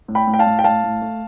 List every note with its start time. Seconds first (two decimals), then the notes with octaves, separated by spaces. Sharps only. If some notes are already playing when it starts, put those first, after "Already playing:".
0.08 A2
0.15 G5 B5
0.27 A2
0.34 G5
0.39 F5 A5
0.47 A2
0.59 G5
0.64 A2 F5 A5
0.84 A2
1.02 A3